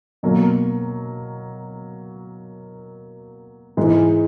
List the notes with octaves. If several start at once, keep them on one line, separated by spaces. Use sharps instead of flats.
B2 F#3 A#3
G#2 E3 G#3